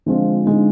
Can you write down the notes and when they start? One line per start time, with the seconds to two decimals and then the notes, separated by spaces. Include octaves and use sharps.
0.06 D3 F3 G#3 C4 F4
0.45 D3 G#3 D#4